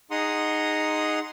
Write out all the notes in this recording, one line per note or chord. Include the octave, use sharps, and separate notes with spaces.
D#4 G#4 F#5 A#5 C6 D#6